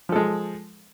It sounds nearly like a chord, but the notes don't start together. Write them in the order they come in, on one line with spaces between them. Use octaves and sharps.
F3 A4 G#3